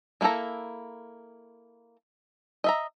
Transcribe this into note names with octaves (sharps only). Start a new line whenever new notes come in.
G#3 A#3 E4 A4 A#5
D#5 E5 A#5